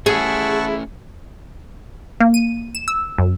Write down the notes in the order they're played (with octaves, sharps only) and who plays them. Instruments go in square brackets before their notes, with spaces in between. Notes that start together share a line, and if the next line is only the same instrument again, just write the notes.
[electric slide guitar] A3 C#4 [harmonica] E4 [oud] G#4 [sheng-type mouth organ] F#5 A5 C#6
[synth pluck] A#3
D#7
E7
E6
F#2